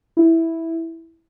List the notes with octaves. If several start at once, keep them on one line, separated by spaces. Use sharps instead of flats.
E4